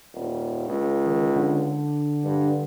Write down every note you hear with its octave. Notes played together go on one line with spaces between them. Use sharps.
D#1
C#2
D#3
D3
G2